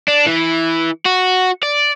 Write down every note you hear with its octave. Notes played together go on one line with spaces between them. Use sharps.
D4
E3
F#4
D5